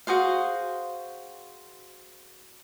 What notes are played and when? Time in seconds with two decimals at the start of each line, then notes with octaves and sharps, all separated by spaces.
0.07 F#4 G#4 C5 F5